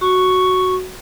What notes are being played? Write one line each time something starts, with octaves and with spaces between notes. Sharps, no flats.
F#4 C#6